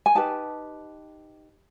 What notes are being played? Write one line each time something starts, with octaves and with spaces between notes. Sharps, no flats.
G#5
D#4 G4 B4 A5